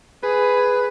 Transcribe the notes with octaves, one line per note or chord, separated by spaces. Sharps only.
G#4 B4